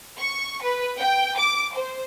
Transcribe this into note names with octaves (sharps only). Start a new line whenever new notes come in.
C#6
B4
G5
D6
C5